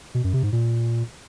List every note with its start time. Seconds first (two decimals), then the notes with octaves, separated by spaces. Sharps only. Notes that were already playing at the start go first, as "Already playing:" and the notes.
0.14 B2
0.24 F#2
0.33 C3
0.43 G#2
0.52 A#2